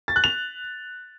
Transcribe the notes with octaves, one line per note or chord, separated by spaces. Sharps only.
A6
F#6
F7